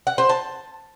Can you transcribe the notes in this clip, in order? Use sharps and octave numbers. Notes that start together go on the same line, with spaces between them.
F#5
C5
A5